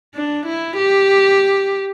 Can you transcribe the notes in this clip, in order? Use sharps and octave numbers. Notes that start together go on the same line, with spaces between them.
D4
E4
G4